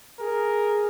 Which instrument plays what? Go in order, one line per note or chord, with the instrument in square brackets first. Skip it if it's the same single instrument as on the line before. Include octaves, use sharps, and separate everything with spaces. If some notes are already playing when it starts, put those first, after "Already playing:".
[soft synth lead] G#4 [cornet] A#4